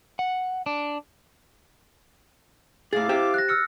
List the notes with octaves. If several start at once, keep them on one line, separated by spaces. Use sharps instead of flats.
F#5
D4
A2 E4 G#4 F5 D6 A6
G4 C5 G5
F#6 A#6
E6 F6 C#7